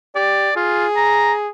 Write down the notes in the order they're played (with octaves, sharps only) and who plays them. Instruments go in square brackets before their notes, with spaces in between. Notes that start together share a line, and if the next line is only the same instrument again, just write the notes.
[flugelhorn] G4 [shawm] D5
[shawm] F4 [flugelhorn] G#4
[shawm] A#5